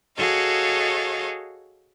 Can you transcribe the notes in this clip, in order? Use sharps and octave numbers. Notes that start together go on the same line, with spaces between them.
F#4 G#4 A4 C#5 D#5 F5